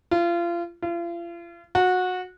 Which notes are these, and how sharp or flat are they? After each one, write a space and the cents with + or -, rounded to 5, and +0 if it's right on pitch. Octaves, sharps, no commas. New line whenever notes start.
F4 -30
F4 -40
F#4 -20